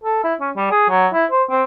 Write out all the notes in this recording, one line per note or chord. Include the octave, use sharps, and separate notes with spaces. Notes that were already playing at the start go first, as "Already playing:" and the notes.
A4
E4
C#4
G3
G#4
F#3
E4
C5
C4